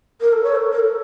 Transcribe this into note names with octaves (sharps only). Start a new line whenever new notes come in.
A#4
A4
C#5
A4
A#4
A4